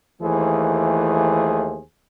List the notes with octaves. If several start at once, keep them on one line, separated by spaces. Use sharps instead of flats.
D#2 E3 A3 G#4 C5